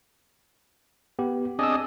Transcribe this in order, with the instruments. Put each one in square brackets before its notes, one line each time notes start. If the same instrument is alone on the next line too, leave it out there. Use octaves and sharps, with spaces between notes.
[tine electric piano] B3 G4
[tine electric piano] C4 E6 [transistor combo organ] D4 G#4 D#5